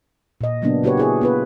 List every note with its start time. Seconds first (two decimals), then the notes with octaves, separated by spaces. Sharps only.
0.41 A#2 D#5
0.62 C#3 F#3 A#3 B3 D4
0.83 C#3 A#3 F#4 G4 B4 C#5
0.97 E4 G#4 C#5
1.21 B3 F4 B4